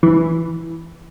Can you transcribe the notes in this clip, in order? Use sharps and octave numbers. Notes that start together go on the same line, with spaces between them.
E3